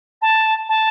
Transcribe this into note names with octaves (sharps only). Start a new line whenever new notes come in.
A5
A5